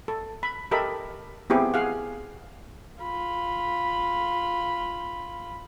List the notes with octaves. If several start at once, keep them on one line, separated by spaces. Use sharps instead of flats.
A4
B5
G4 A4 A#4 D#5 E5 B5
B3 C4 E4 G4 G#4
G#4 F5 F#5
F4 B5